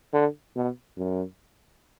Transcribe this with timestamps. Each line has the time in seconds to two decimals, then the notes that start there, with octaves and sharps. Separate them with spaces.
0.13 D3
0.56 B2
0.97 F#2